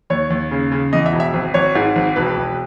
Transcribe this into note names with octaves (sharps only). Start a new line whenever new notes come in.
D#2 C#5
D#2
C#3
C#3
E2 D#5
E5
E1
E5
G#1
G#1 C#5
G#2
G#1
E1 B4
E1